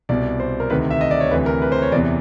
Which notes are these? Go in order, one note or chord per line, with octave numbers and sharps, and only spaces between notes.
C2 B2 D5
C5
A#4
D2 C3 D#3 B4
E5
D#5
D5
C#5
D2 C3 E3 B4
A#4
B4
C5
C#5
E2 C3 E3 D5